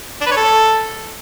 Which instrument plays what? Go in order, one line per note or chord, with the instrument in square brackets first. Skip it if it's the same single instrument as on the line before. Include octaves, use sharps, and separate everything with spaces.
[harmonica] D4
B4
C#5
A4